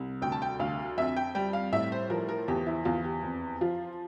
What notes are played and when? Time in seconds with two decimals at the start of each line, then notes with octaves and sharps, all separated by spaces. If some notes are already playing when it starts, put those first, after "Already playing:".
Already playing: C2
0.22 D2 G5
0.32 A5
0.42 G5
0.59 D2 F5
0.97 F2 E5
1.17 G5
1.35 G3 G5
1.53 F5
1.72 A2 E5
1.92 C5
2.10 F3 A#4
2.29 A#4
2.48 E2 G4
2.67 E4
2.85 E2 F4
3.04 G4
3.23 F2
3.61 F3 F4